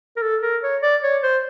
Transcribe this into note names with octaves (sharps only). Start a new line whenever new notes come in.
A#4
A4
A#4
C#5
D5
C#5
C5